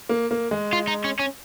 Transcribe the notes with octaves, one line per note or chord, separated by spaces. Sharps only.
A#3
A#3
G#3
F4
D#4
C#4
C#4